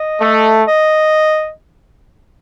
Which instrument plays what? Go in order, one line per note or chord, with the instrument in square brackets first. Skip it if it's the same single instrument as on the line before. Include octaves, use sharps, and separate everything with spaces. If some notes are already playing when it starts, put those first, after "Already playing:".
Already playing: [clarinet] D#5
[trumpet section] A3
[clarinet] D#5